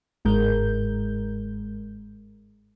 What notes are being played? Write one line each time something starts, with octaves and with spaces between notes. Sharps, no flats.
G1 G#2 G#3 A#4 G6